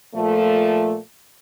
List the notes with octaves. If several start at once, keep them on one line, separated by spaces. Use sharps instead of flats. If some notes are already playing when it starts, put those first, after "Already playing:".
A#2 F3 A3